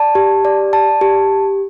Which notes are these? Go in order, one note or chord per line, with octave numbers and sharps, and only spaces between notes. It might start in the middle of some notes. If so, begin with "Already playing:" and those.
Already playing: D5 A5
G4
D5
A5
G4